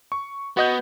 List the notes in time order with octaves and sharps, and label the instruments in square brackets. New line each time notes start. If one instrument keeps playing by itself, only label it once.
[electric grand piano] C#6
[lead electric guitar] B3 [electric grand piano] F#4 D#5 G6